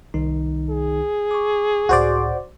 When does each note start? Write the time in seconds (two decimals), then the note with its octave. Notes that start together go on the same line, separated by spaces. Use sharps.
0.14 C2 D#3 D#4
0.70 G#4
1.31 C#6 D6
1.89 C#2 A2 F#4 C5 D5